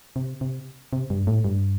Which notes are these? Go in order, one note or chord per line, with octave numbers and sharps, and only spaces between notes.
C3
C3
C3
G2
A2
G2